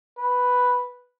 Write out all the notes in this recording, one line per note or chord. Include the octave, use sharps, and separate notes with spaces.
B4